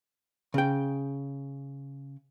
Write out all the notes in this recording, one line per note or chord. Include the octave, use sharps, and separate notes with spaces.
C#3 G5